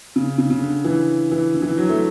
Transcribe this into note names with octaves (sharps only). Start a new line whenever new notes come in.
C#3
C#3
C#3
D3
E3
E3
D3
E3
D3
F#3
A3